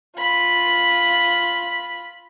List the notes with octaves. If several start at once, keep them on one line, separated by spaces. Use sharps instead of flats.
F4 B5